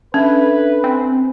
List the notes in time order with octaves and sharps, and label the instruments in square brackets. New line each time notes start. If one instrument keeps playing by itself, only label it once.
[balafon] C#4 [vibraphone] D4 A4 E5 [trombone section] B4
[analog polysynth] C4 [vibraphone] G#5